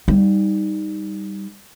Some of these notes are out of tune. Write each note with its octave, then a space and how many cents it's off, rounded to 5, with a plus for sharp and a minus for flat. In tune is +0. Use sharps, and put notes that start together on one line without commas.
G3 +0 D#4 +0